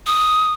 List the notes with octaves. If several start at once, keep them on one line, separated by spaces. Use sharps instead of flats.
D#6